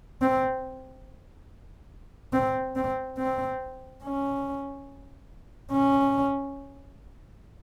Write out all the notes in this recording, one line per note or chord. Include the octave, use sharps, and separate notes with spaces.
C4
C4
C4
C4
C#4
C#4